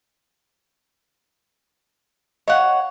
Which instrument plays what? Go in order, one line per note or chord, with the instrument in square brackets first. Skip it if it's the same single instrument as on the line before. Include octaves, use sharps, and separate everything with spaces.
[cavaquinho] C#5 F#5 [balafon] D#5 F5